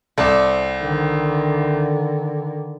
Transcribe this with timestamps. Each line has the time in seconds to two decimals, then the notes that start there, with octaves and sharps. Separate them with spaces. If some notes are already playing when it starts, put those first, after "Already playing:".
0.18 C2 C4 A4 D5
0.82 D3 D#3